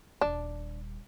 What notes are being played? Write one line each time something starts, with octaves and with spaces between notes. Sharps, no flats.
D#1 G3 D4